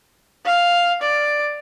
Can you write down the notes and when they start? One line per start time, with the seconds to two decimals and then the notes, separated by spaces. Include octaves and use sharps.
0.45 F5
1.01 D5